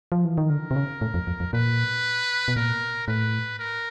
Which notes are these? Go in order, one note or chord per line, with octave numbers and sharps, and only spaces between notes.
F3
E3
D#3
D3 A#4
C3
C#3
A2
F2
F2
F2
A#2 B4
B2
A#2 A#4
A2 B4
A#4